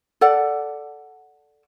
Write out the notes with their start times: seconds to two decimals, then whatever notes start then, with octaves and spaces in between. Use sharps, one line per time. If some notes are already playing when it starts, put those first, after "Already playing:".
0.21 A4 D5 F#5